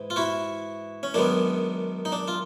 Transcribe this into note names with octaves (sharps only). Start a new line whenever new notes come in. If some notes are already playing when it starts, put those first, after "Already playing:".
Already playing: G#2 E3
F4
E4 F#4
C#4
F#2 D#3 G#3 B3 D4
D#4
D4
F4